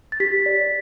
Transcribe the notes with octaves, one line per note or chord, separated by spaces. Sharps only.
A6
G4 B6
D5